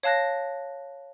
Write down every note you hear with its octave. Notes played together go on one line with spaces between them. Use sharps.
C#5 F5 A5 F#6 A#6